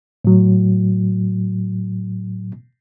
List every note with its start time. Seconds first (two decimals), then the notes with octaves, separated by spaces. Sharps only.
0.25 A2 F#3